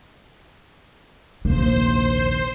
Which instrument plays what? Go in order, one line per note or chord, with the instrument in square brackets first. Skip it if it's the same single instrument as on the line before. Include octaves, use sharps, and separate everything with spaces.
[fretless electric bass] F1 A#1 D#2 [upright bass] A#3 [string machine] C5